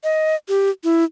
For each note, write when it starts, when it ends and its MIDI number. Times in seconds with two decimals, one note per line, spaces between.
0.04 0.35 75
0.49 0.70 67
0.84 1.04 64